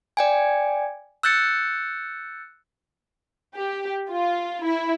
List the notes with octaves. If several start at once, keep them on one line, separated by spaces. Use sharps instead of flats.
D5 G5 G#5
E6 F#6 G6 A6 C#7
G4
F4
E4